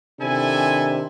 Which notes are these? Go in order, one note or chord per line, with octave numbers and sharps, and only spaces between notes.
C3 D#3 D4 E4 A4 G#5